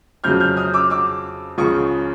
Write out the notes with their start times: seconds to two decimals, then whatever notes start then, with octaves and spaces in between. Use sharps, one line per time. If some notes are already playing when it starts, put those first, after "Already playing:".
0.24 F2 C#3 F#3 F6 G6
0.40 F6 G6
0.57 D#6 F6
0.74 D6 E6
0.90 D6 E6
1.58 C#2 C#3 F3 C#6 D#6